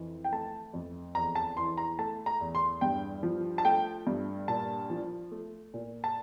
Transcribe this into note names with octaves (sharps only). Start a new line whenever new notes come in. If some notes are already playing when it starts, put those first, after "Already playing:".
Already playing: F2 E3
G5
A3 A5
F2
E2 A#5
A5
E3 C6
A#5
A3 A5
A#5
E2
C6
G2 G5
F3
A5
A3 G5
G2
A#2 A5
F3
A3
A#2
A5